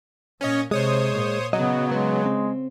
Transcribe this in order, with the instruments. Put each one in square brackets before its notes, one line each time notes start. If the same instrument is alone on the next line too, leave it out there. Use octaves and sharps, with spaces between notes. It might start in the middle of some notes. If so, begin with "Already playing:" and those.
[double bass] A#2 [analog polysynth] C#4 C#5 D#5
[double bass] C3 [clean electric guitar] G#3 [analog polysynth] C5 C#5 D#6
[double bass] A#2
[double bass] C#3 [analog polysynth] F#3 [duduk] B3 [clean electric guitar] D#5
[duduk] G#3 [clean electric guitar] B3
[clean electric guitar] C4